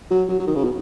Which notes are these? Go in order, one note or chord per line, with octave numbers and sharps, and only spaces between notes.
F#3
F#3
F#3
D#3
C#3
B2